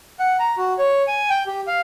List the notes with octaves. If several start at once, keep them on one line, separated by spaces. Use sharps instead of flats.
F#5
A#5
F#4
C#5
G#5
G5
G4
F5